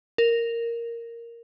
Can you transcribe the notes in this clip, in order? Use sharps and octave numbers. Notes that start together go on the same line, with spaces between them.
A#4